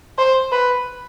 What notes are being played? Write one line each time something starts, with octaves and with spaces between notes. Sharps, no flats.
C5
B4